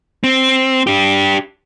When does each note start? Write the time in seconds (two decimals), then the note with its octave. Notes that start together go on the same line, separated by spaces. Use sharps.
0.24 C4
0.87 D4 G4